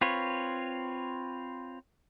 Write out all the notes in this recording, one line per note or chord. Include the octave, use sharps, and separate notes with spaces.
C4 F4 B4 C#5